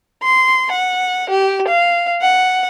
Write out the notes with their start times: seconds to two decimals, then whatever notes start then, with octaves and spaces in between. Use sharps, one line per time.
0.22 C6
0.71 F#5
1.29 G4
1.67 F5
2.21 F#5